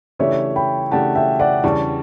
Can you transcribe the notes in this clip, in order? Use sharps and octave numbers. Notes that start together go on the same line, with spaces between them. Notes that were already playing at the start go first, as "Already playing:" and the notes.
C#3 E3 A3 D4 G4 C#5 E5
G5 B5
C#3 E3 A3 D4 G4 F#5 A5
E5 G5
D5 F#5
E2 C#3 G3 D4 A5 C#6